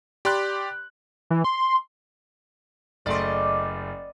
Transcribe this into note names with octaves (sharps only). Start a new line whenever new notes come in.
G4 D5 B5 C6 F#6
E3
C6
F#1 A3 D5 D#5 C6